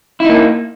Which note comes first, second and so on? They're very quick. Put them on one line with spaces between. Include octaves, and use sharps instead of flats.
E4 D#4 A#3